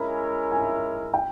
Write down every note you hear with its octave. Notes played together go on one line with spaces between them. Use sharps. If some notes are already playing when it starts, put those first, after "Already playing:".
Already playing: G#3 C#4 E4 A#4 E5 B5
G#5
G5